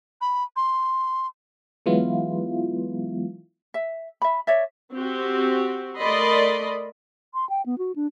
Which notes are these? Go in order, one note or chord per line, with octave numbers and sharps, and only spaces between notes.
B5
C6
E3 F#3 G#3 B3 E4 F4
E5
E5 B5
C#5 D5 E5
C4 F#4 G4
A3 A#4 D5 D#5 B5 C6
C6
G5
B3
F#4
D4